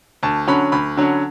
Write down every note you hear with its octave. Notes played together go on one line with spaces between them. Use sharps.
D2 A5
D3 F#3 C#4 B5
D2 B5
D3 F#3 C#4